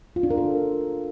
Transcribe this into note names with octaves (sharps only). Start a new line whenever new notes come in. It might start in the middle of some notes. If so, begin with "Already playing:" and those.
F4
D4
A#4
A4